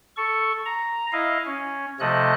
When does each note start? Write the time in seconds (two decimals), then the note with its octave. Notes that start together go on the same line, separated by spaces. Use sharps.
0.17 A4 C#6
0.65 A#5
1.12 E4 D#5 F5
1.45 C#4
2.00 C3 F3 A3 A4 D#5 F#6